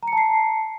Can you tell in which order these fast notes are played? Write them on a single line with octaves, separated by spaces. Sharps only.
A#5 C#7 A5 C7